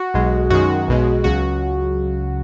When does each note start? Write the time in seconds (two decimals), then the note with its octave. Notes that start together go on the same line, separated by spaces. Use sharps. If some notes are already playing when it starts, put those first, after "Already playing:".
Already playing: F#4
0.14 B1 B2 G#3
0.50 F#2 D#3 G#3 F#4
0.88 B1 B2 G#3
1.24 C#2 C#3 F#3 F#4